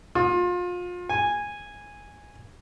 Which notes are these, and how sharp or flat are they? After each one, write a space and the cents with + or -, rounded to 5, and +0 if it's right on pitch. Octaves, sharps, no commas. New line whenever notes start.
F4 +30
G#5 -10